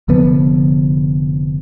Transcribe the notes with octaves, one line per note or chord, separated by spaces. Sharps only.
F1 D3 F3 B3